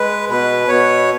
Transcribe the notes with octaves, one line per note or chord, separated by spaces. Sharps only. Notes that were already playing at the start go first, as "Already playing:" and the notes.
Already playing: G#3 B4
B2 B4
B2 C#5